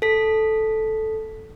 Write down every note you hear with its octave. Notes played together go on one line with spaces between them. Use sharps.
A4 B6